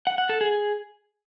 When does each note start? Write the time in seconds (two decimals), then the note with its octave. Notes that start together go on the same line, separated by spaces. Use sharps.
0.07 F#5
0.18 F#5
0.29 A4
0.41 G#4